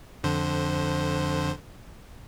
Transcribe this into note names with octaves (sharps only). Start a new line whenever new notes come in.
F2 D3 C5